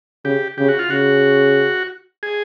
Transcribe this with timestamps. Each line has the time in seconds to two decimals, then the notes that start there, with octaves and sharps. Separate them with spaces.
0.25 C#3 G4
0.58 C#3 G4
0.69 F#4
0.79 F4
0.90 C#3 F#4
2.23 G#4